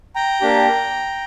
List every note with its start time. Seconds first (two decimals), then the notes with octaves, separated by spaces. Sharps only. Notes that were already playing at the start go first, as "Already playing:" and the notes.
0.16 G5 A#5
0.41 A#3 D4 G4